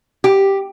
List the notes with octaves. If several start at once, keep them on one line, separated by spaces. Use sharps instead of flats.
G4